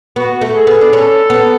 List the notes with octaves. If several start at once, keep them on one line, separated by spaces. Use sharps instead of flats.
B3 F#4
A3
G#4
B3
D4
C#4 A4
B3